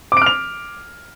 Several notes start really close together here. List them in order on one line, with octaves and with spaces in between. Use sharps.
D6 D7 F6 F7